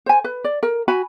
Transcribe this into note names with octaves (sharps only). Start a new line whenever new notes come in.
C5 G#5
B4
D5
A#4
F#4 G#5 B5